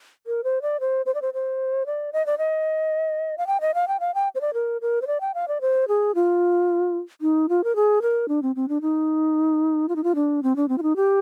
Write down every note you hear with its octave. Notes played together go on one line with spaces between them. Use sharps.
A#4
C5
D5
C5
C5
D5
C5
C5
D5
D#5
D5
D#5
F5
G5
D#5
F5
G5
F5
G5
C5
D5
A#4
A#4
C5
D5
G5
F5
D5
C5
G#4
F4
D#4
F4
A#4
G#4
A#4
D4
C4
C4
D4
D#4
F4
D#4
F4
D4
C4
D4
C4
F4
D#4
G4